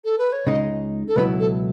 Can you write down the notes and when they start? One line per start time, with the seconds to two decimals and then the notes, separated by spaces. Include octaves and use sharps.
0.04 A4
0.18 B4
0.32 C#5
0.46 C#2 C#3 G#3 D#4 D#5
1.08 A4
1.16 C#2 B2 F#3 B3 E4 B4
1.40 A4